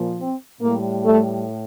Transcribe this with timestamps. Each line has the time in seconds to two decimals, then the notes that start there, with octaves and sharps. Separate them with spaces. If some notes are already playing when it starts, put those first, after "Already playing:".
Already playing: A#2 F3
0.19 C4
0.62 A2 G3 A#3
1.05 A3